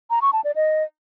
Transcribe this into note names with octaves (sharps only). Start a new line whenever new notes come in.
A#5
C#6
A5
D5
D#5